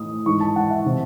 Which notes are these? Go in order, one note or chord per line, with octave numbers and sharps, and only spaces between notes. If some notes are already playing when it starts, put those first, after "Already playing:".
Already playing: A2 E3 D#6
G#2 E3 C#6
A5
F#5
E5
C3 E3